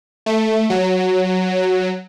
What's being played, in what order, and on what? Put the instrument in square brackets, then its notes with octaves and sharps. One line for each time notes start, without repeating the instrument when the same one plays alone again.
[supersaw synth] A3
F#3